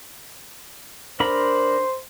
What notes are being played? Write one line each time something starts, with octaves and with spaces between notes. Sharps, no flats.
D4 A#4 C5 B5